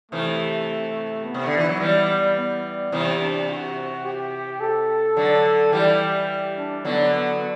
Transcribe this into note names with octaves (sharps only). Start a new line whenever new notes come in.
C3 E3 A3
B3
C3
D3
E3
F#3
E3 G3 B3
B3
C3 E3 B3
D4
F#4
G4
A4
D3 F#3
E3 G3 G4
D4
D3 F#3 B3
B3